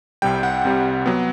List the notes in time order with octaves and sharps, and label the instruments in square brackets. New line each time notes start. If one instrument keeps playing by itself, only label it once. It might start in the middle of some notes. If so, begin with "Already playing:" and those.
[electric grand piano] C2 C3 G3 G5
F#5
C2 C3 G3
F#3 B3